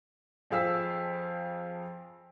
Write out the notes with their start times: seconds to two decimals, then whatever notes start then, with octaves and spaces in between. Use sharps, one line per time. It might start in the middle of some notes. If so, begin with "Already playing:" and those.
0.50 F2 F3 G#4 F5 E6 B6